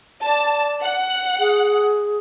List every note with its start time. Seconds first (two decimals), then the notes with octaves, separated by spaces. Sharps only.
0.25 D5 A5
0.83 F#5
1.39 G#4